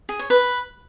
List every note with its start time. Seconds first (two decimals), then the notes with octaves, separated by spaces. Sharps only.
0.09 G#4
0.19 C#5
0.30 B4